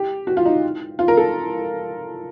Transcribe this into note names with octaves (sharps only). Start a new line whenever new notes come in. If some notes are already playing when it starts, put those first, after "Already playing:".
Already playing: G4
F#4
F4
D#4
F4
A#4
A4